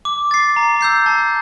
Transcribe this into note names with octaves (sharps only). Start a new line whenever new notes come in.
D6
A6 C7
A#5
E6 G6 C7
A5